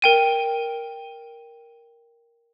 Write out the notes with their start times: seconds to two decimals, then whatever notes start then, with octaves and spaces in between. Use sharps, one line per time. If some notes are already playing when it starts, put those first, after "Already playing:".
0.02 A#4 G5 D#7